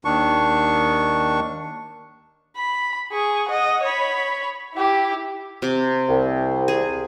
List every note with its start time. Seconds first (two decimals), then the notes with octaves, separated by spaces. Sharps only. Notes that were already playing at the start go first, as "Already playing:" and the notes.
0.05 D#2 D#3 D4 C#6
2.56 B5
3.12 G#4 C#6
3.49 D#5 F#5
3.83 C#5 B5
4.75 E4 G4
5.62 C3 D6
6.09 C2
6.68 G#4